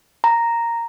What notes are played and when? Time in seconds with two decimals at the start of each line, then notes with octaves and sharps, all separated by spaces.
0.24 A#5